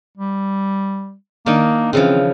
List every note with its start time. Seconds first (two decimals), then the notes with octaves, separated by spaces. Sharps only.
0.18 G3
1.46 D#3 A#3 D4 D#4
1.93 C#3 E3 F3 C4